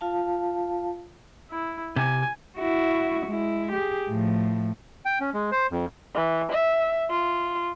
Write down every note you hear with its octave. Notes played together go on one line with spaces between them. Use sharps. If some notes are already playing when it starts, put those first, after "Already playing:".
F4 F5 A5
E4
C3 G#5
E4 F#4
G#3 E4
G4 G#4
A2 F3
G5
C#4
G#3
C5
F2
E3
E5
F4